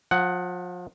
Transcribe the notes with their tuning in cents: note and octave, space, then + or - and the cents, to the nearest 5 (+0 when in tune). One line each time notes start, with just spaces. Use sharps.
F3 +35 F#5 +10